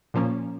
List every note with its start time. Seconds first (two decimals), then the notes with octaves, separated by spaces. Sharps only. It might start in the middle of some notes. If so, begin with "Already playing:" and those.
0.14 A#2 F3 A#3 C#4